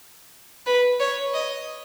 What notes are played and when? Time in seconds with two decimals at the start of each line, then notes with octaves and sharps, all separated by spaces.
0.66 B4
1.00 C#5
1.34 D#5